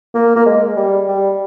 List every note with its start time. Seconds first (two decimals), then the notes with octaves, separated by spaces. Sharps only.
0.14 A#3
0.36 A#3
0.46 G#3
0.77 G3
1.08 G3